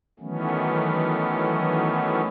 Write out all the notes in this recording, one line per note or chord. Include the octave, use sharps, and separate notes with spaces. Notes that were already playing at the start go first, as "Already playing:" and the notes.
D#3 E3 F#3 A3 B3 C#4